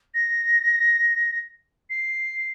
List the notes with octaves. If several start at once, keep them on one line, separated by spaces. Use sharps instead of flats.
A#6
C7